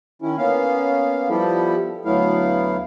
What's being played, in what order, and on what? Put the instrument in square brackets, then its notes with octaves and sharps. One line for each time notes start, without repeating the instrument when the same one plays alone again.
[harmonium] D#3 C#4 E4
A#3 B3 C#4 F5
F3 G3 B3 E4 G4 A4
D2 F#3 A3 B3 E4 F5